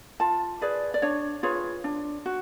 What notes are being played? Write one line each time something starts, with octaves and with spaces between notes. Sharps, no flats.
F4 A5
G#4 B4 D5
D5
D4 C#5
F4 G#4 B4 C#5
D4
F#4